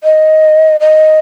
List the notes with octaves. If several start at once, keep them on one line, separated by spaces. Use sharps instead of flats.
D#5
D#5